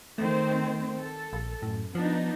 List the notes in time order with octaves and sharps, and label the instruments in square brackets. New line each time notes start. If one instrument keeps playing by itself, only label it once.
[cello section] D#3 C4 C5 [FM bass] A3
[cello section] A4
[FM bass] A#1
[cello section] F#2 [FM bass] A2
[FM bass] F3 [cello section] B3 D4 D#4